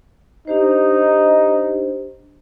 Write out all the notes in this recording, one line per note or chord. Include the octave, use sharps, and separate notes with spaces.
D4 D#4 G4 C5